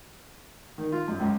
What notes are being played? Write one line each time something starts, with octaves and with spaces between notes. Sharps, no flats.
D#3
F4
F#2
C#2